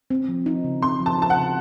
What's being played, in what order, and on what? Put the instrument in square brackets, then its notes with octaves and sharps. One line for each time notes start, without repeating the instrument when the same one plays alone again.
[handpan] C4
F3
D#4
C#3
[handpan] C4 [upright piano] C6
[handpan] F3
[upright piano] A5
[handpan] D#4 [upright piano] A5
[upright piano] F#5
[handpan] C#3